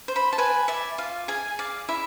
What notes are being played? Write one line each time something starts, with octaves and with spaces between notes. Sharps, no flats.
C5
B5
A5
B4 G#5
D5 E5
F4 F5
G#4 G#5
D5 F5
E4 E5